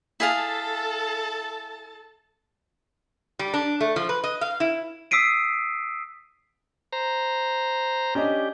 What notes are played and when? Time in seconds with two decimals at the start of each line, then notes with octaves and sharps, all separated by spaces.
0.20 E4 G#4 A4 F5 A5
3.39 G3
3.54 D4
3.81 A3
3.96 F3
4.09 B4
4.24 D#5
4.41 F5
4.60 E4
5.11 D#6 E6 B6 C7 D7 D#7
6.93 C5 A#5
8.15 C#4 D4 G4 D#5